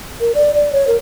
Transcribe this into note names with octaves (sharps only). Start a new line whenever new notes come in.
A#4
D5
D5
C#5
A#4